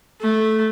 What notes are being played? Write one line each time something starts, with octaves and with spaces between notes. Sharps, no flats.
A3